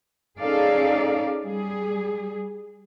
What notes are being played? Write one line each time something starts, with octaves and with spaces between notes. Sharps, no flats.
C#4 D#4 G#4 A4 D5 F5
G3 G#4